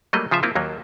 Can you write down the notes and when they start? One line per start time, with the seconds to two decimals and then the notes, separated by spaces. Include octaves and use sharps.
0.13 F#3 G3 A3 A#3 D#5
0.31 C#3 F3 F4 E5
0.43 A#3 C4 E4 F4
0.55 D#2 F#3 A#3